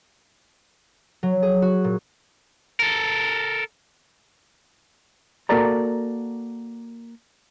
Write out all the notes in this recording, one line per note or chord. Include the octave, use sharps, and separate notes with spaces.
F#3
G#4
F#4
A#2
A4 A#4
A#3 F#4 A4 A#4 D5 A#5